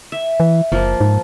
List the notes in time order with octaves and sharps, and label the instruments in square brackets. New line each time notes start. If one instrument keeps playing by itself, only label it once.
[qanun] E5
[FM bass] E3
[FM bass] F#1 [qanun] F3 A#3
[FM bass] G#2